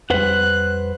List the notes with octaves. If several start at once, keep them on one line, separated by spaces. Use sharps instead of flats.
F2 G3 B4 C5 F#5 F#6